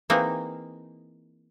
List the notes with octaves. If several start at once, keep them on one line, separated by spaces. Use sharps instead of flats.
E3 A#3 C4 D#4 G#4